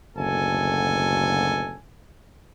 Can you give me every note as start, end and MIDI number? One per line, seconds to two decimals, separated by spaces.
0.16 1.78 30
0.16 1.78 38
0.16 1.78 47
0.16 1.78 69
0.16 1.78 80